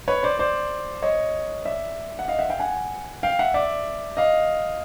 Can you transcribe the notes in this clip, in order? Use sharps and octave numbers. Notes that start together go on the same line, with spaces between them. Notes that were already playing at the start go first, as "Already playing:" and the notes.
B4 C#5
C5 D5
C5 D5
C#5 D#5
D5 E5
F#5
D#5 F5
E5 F#5
F5 G5
F#5 G#5
F5 G5
E5 F#5
D5 E5
D#5 F5